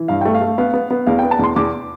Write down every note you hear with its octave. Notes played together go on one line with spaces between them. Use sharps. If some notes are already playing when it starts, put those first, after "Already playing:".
Already playing: E3
G2 F5
A3 G5
F5
A3
B3 F5
B3
B3
E2 F5
B3 G5
A5
E2 C6
E2 D6